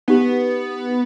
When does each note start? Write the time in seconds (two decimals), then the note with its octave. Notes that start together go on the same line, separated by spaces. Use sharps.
0.08 B3 D#4 G4